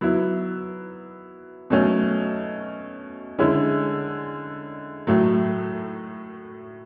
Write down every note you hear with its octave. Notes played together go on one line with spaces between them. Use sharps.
F#3 B3 E4
B2 F#3 A3 C#4
D3 G#3 C#4 E4
A2 F#3 A3